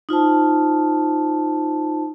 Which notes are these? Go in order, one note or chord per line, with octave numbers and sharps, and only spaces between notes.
D#4 F4 C5 A5